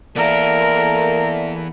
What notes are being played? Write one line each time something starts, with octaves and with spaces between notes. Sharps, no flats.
E3 A#3 B3 A4 A#4 D5 E5